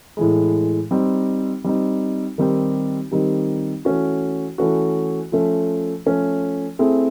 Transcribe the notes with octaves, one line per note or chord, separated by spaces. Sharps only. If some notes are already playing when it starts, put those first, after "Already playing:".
A2 E3 G#3
G3 C4 D#4
G3 C4 D#4
D#3 G3 C4 D#4 G4
D#3 G3 C4 D#4 G4
E3 A3 C#4 F#4
E3 A3 C#4 F#4
F3 A3 C#4
F3 A3 C#4
A3 C4 E4 G#4